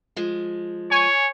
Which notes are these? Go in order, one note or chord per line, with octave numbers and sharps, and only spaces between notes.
F3 G#3
C#5 G#5 C#6